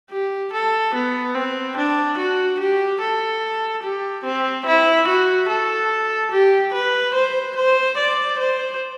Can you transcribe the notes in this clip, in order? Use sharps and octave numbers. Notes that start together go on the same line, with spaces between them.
G4
A4
B3
C4
D4
F#4
G4
A4
G4
C4
E4
F#4
A4
G4
B4
C5
C5
D5
C5